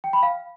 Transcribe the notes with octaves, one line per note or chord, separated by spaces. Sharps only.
G5
B5
F5